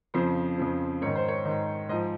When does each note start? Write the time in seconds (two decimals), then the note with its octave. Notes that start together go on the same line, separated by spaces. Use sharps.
0.14 F2 C#3 F3 C5
0.58 F2 C#3 F3
1.02 G#2 D#3 C#5
1.15 C5
1.28 C#5
1.45 G#2 D#3
1.89 G#2 D#5
1.93 F3